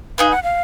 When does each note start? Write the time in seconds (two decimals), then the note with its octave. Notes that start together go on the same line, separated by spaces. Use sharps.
0.18 D#4 G#4 B4 F5
0.31 F#5
0.43 F5